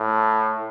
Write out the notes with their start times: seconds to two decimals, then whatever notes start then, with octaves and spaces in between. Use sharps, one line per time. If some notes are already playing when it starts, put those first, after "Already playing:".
Already playing: A2